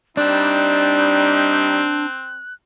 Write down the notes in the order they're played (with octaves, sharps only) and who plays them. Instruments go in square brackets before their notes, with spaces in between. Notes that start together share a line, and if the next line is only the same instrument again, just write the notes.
[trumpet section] G3 D#4 [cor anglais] C4 [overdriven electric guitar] D4 [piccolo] F#6